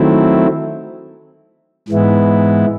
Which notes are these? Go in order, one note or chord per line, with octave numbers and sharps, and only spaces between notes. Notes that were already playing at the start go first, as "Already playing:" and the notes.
Already playing: D#3 F#3 A3 C4 E4
G#2 E3 G#3 B3 E4